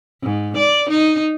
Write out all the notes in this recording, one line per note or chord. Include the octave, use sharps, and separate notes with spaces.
G#2
D5
D#4